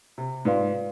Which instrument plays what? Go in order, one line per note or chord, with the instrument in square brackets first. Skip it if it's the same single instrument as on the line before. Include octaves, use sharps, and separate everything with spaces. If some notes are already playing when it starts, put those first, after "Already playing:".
[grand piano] C3
[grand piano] G#2 [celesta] F4 B4 D5 F5 C6